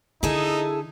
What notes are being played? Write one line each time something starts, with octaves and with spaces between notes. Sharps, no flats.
D3 D#4 E4 G#4 A4